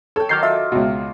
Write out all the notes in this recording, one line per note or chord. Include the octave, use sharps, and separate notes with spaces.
A4 C#5 G5
D#3 F#3 D6 F6 G6 C7
F4 E5
C#2 B2